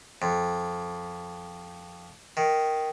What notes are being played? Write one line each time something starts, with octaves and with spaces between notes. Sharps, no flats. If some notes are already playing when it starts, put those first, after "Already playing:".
F2
D#3